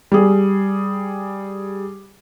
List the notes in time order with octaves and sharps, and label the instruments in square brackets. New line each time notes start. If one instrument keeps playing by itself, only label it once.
[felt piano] G3 G#4